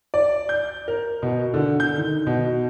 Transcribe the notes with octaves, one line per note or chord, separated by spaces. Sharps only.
D5
G6
A#4
B2
D3
G6
D#3
B2